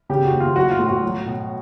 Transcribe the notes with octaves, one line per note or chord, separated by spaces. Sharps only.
C#3 G4
F#4
D#2
F4
F#3 F#4
F4
A2
F#4
F#3
B2